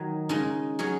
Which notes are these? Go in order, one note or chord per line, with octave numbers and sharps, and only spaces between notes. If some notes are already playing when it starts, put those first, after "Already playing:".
Already playing: D#3 F#3 D#4
C#3 G#3 D#4
F#3 C#4 G#4